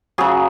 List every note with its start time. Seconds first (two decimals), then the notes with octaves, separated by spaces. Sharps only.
0.18 C#3 F#3 G#4